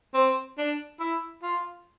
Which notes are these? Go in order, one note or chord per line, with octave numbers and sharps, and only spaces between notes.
C4
D4
E4
F4